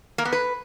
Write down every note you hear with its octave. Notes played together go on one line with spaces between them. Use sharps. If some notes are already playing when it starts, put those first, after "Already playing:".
A#3
B3
B4